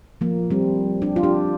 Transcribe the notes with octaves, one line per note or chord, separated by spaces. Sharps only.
F3 A#3
G3 C4
D4 G4
F4
D4 G4